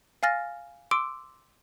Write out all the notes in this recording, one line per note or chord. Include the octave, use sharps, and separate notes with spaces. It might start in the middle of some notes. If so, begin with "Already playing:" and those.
F5 G#5 F6 A6 A#6
C6 D6 E6 D7